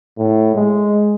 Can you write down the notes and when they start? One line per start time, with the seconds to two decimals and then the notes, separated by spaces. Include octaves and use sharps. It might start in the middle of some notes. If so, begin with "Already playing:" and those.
0.17 A2
0.55 G#3